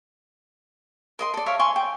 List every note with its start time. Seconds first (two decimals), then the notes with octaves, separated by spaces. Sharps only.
1.19 A#4 D#5 C6
1.34 A4 D5
1.46 A#4 C#5 E5 F5
1.59 G#5 C6 C#6
1.76 G5